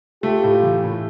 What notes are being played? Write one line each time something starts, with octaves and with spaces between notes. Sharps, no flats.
A3 F4 G4
A2
E3
A2